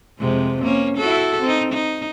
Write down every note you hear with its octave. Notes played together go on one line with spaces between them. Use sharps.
F2 C3 G#3
A#3 C#4
E4 F#4 A4
C4 D#4
D#4